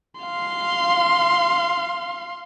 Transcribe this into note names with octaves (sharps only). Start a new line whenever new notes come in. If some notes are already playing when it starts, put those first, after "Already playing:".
F5 C6